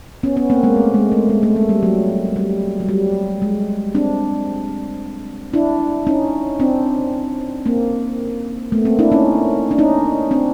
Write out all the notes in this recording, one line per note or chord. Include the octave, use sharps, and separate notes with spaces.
B3 C#4
B3 C#4
A#3 C4
G#3 A#3
A3
G#3
A3
G#3
A3
G#3
G3
F#3
G3
F#3
G3
G#3
C4 D4
D4 E4
C#4 D#4
C4 D4
A#3 C4
A3 B3
A#3 C4
D4 E4
C#4 D#4
D4
C#4 D#4
C4 D4